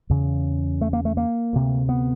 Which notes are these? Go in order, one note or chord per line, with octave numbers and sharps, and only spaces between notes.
E2 C#3
A3
A#3
A3
A#3
D2 C3
B3